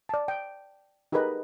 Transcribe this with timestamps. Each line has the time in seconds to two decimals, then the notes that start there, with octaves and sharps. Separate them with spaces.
0.09 D5 A5
0.28 G5
1.12 D#4 G4 G#4 A#4 B4 D#5